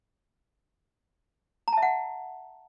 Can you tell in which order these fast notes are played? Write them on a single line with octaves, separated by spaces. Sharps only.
A#5 A5 E5 F#5